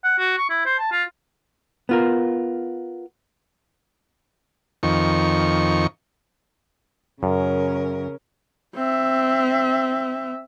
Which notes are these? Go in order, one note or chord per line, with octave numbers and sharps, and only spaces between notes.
F#5
F#4
C#6
E4
C5
A5
F4
B3 F4 A#4
F2 D#3 C#6
F#2 C#3 C#4 A#4
C4 E5